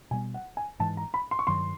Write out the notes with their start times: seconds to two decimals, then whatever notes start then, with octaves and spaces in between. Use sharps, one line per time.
0.11 B2 G3 B3 G#5
0.34 F#5
0.57 G#5
0.80 G#2 E3 G#3 A5
0.97 A#5
1.14 B5
1.31 C6
1.39 C#6
1.47 G2 D#3 F#3 C6